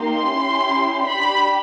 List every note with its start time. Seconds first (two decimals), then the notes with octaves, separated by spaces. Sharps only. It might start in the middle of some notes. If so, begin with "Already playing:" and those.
Already playing: A#3 D#4 G4 C6
0.29 C#4 E4 G4
1.04 D4 G4 B5